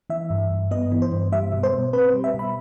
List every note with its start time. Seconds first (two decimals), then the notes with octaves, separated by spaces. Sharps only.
0.10 E3 E5
0.30 G2
0.51 G2
0.71 B3 D#5
0.92 E3
1.02 C5
1.12 G2
1.32 G3 E5
1.52 B2
1.63 C5
1.73 B2
1.93 C4 B4
2.09 C5
2.14 G3
2.24 E5
2.34 B2
2.39 B5